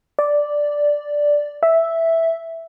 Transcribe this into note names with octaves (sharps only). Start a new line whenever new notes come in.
D5
E5